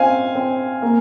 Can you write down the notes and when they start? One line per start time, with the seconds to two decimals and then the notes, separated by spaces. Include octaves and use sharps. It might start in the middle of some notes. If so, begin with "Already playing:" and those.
Already playing: C4 F5 G#5
0.35 C4
0.82 A#3